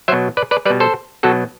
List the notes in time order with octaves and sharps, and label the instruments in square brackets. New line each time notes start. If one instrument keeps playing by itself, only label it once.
[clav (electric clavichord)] F#3 C5 E5
B2
B4 D5
B4 D5
G3 B4 D5
B2
A4 C5
B2 F#3 F#4 A4